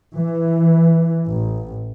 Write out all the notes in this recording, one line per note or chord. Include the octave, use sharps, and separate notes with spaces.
E3
A1